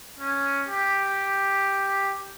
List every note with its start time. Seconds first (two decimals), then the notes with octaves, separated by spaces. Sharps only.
0.19 C#4
0.68 G4